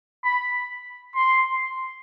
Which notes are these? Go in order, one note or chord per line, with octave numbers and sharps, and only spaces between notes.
B5
C6